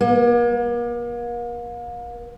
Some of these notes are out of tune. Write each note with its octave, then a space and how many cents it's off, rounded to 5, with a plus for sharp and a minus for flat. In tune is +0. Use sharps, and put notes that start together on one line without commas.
A#3 +40